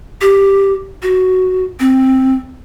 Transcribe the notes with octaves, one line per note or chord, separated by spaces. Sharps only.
G4
F#4
C4